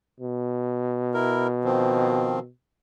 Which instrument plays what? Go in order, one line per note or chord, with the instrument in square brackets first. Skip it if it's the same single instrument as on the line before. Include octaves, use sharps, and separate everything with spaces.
[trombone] B2
[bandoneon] E4 A#4
D#3 F3 C4